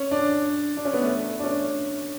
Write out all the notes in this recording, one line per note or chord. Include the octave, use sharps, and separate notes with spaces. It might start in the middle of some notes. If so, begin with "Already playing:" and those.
Already playing: C#4
D4
D4
C#4
B3
A3
D4
C#4